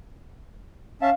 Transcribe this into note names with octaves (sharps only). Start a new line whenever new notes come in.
C#4 E5 F5 A5